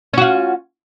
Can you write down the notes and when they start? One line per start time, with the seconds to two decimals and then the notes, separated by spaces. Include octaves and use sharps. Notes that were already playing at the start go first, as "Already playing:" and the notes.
0.14 C#4
0.18 F#4
0.22 F4